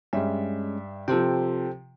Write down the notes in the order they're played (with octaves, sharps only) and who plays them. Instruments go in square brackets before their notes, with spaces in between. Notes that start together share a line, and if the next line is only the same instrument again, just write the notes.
[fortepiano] G2 E5 [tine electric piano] G#3 C#4
[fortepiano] C3 F3 [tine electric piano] A4 C5 G5